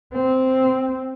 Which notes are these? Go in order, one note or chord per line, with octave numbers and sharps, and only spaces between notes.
C4